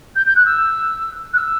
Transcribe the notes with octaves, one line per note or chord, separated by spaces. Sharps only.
G6
G6
F#6
E6
F#6
E6